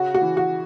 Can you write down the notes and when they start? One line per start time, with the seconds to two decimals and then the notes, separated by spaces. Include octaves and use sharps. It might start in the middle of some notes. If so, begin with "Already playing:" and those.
Already playing: C#3 F#4
0.14 F#4
0.22 E3
0.37 F#4